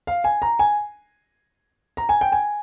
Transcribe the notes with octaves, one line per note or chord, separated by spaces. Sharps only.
F5
G#5
A#5
G#5
A#5
G#5
G5
G#5